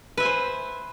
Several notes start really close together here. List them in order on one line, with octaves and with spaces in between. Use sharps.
B4 E5 G#5 C5